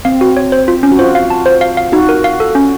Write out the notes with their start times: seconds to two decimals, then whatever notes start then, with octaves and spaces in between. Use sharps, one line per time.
0.05 C4 F5
0.21 F#4
0.37 C#5
0.52 C5
0.68 F4
0.83 C#4
0.92 F#4
0.99 F4 C5
1.15 F5
1.30 A5
1.46 C5
1.61 F5
1.77 F5
1.92 D#4 F#4
2.09 A#4
2.24 F5
2.40 A4
2.55 C#4